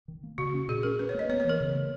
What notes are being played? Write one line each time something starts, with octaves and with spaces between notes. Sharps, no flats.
D#3
A#3
C#3 F#4
C#4
A#2 G#4
C#4 A#4
C#4 B4
C#5
A#3 D#5
B3 C#5
C#5
E3 A#4
C#3
A#3